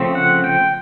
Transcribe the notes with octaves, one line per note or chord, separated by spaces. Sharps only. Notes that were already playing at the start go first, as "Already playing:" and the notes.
Already playing: C#3 F3 A3 C4
F#5
G5